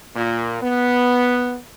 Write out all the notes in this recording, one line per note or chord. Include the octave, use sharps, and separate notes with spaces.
A#2
B3